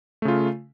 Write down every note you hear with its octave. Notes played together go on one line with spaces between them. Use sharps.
C#3 A3 F4